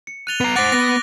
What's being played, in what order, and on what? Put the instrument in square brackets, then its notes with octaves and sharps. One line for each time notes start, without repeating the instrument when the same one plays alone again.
[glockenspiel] C#7
[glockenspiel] F#6 A6 [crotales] D#7 F7 G7
[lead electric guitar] B3 A#5
[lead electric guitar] C5 F#5 [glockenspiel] D6 D7 F7 [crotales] F#6 A6 A#6
[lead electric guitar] B3 [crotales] A#6